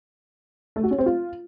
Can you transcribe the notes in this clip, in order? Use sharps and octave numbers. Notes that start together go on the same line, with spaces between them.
A3
F#4
C#4
C4
F4